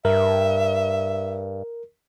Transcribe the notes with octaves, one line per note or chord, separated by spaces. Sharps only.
G2 A#4 E5